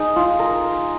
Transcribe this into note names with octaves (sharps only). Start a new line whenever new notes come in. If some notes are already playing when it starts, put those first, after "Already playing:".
Already playing: D#4 G#4
F4
A#4